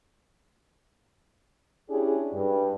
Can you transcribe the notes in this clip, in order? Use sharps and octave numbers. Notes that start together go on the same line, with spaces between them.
C#4 D4 E4 G4 G#4
G2